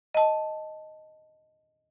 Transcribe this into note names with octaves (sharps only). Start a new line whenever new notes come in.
D#5 A5